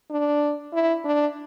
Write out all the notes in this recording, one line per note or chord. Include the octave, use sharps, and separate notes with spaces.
D4
E4
D4